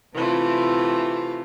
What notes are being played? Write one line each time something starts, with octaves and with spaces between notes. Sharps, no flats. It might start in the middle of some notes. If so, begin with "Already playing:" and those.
C3 E3 A3 F4